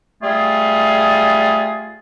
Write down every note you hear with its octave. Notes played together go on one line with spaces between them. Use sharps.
G3 A3 F4 G#4